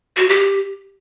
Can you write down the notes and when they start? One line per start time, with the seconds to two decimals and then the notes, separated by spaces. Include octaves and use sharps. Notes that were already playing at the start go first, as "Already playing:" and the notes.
0.17 F#4
0.29 G4